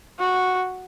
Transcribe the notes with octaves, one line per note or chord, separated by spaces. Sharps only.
F#4